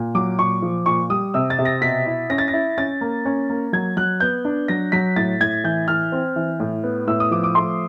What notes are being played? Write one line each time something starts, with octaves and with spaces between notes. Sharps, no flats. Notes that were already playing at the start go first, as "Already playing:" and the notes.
Already playing: A#2
F#3 D6
A#2 C#6
F3
A#2 C#6
G3 D#6
C3 E6
A6
C3
A#6
B2 B6
E4
C#4 A#6
A6
A#6
E4
C#4 A6
A#3
C#4
A#3
F#3 G#6
F#3 F#6
B3 G6
D4
F#3 A#6
F#3 B6
A2 A6
A2 G#6
E3 G6
E3 F6
C4
E3
A2
B3
A2 E6
D#6
F3 D6
D6
A3 C6